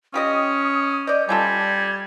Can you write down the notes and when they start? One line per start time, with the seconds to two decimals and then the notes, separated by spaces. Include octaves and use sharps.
0.14 C#4 F4 G4 D#5 D#6
1.07 D5 D#5 G6
1.29 G3 C#4 F4 A4 G#6